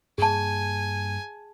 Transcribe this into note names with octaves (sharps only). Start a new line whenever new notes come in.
G2 A#3 G#4 G#5 A5